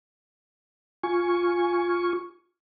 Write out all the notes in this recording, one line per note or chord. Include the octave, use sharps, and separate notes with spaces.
F4 G#5 C#6